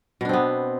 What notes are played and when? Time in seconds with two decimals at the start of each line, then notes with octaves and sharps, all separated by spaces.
0.21 B2
0.25 D4
0.29 C4
0.33 B3